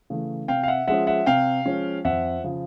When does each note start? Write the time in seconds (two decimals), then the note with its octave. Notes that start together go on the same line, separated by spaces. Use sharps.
0.10 C#3 E3 A3
0.48 C3 F5 G5
0.63 F5
0.68 E5 F#5
0.88 F3 G#3 C#4 E5 F#5
1.07 E5 F#5
1.26 C3 F5 G5
1.65 F3 G#3 C#4
2.05 F2 E5 F#5
2.44 C#3 F3